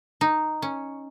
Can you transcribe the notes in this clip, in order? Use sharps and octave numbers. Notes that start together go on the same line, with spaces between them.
D#4
C#4